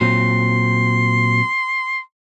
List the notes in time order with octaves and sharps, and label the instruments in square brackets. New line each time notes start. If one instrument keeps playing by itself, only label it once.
[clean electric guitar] A#2 F#3 C4 [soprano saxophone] C6